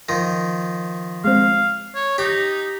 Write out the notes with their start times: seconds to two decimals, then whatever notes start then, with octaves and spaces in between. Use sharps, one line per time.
0.09 D#3 F3 A#6
1.24 G#3 C4 F5
1.95 C#5
2.18 D#4 G4